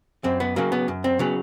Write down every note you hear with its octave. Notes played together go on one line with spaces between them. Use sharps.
F#2 C4
B3
C#3 F#3 A#3
B3
F#2
C4
C#3 F#3 B3